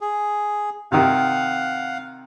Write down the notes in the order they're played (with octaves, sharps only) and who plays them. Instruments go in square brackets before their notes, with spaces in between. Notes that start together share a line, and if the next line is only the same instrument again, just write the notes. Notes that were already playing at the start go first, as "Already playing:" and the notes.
[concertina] G#4
[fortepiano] C3 D#3 [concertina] F5 F#5